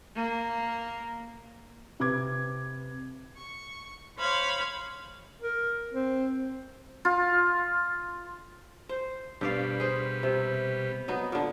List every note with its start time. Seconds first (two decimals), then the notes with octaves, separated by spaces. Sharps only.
0.16 A#3
2.00 C3 B4 D6 G#6
3.37 C#6
4.18 C5 C#5 F5 B5 G#6
5.42 A#4
5.93 C4
7.05 F4
8.89 C5
9.41 G2 B2 G3 D5 F5
9.80 G#4 C5
10.23 C3
11.08 F#3 B3 D#4
11.32 A#2 D3